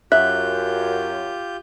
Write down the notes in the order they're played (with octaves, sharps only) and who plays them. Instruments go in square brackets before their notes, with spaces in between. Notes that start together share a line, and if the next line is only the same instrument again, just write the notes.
[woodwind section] F#2 [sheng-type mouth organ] F4 G4 G6 [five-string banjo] E5 [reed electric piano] F#6